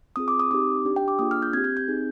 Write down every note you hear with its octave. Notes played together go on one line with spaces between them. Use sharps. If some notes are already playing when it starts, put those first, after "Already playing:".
C4 F4 G#4 D#6
D6
D#6
C4 D#4 G4 D6
D4 G4
G5
D6
A#3 D4 F4 G#4 D#6
F6
G6
C4 G4 G#6
G6
G6
C4 D#4 G#4